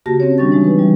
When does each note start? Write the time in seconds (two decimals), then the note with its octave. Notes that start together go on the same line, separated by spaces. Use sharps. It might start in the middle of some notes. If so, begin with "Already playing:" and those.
0.06 C#3 A#3 F#4 G4 A5 A#6
0.20 C4 C#4 C#5
0.38 D#3 G3 D4 C#5 C#6 A6
0.52 E3 G#3 D#4
0.64 B4
0.79 E3 F3 G3